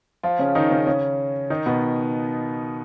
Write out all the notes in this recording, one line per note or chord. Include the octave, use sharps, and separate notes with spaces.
F3 F4
C#3 C#4
D#3 D#4
C#3 C#4
C#3 C#4
D#3 D#4
B2 B3